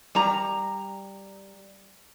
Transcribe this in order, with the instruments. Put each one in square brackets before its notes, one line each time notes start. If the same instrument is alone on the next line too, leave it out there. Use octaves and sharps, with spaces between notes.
[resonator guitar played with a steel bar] G3 A#5